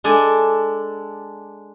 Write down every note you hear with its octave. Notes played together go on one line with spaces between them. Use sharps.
G#3 D4 A4 D5 G#5